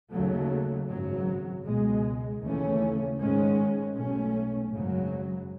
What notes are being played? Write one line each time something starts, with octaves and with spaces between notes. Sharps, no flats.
D#2 C#3 F#3 A3
G#1 F#2 C#3 F#3
C#2 B2 G#3
D#2 C#3 E3 A3 C#4
G#2 D#3 G#3 C#4
B1 B2 A3 C#4
G#1 F#2 C#3 F#3